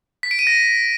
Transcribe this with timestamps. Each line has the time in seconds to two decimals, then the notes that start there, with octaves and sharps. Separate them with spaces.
0.23 B6
0.31 D7
0.39 D#7
0.47 A#6